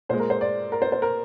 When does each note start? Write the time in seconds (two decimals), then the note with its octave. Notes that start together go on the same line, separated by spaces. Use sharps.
0.09 A#2 C5
0.13 G#3
0.20 A#4
0.30 C5
0.41 D5
0.72 A#4
0.82 C5
0.92 C5
1.02 A#4